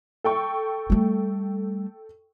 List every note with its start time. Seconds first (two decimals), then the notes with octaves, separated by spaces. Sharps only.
0.24 A4 G5 C#6
0.90 G3 A3